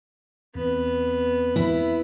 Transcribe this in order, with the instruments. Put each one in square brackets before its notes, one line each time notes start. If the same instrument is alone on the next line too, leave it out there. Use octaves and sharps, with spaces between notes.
[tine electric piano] E2 C4 [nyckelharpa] B3
[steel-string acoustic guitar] E4